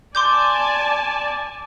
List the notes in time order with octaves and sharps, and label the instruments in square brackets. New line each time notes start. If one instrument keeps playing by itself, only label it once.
[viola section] D5 G#5 A5 [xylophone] C6 D6 G6